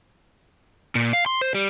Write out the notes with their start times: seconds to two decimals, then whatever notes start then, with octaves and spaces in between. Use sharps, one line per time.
0.95 A#2
1.13 F5
1.26 C6
1.41 C5
1.55 G3